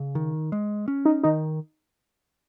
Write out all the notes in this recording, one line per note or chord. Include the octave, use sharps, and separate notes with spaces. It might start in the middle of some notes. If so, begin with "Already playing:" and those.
Already playing: C#3
D#3
G#3
C#4
D#4
D#3 D#4